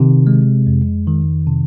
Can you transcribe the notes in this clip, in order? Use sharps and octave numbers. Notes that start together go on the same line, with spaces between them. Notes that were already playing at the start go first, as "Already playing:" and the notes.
Already playing: C3 D#3
G#3
F2
D#3
C3